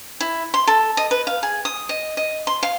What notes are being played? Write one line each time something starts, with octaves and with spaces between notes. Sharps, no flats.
E4
C6
A4
D#5
B4
F5
G#4
D#6
D#5
D#5
C6
F5